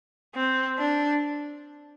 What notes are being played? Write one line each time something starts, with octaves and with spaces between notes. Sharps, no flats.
C4
D4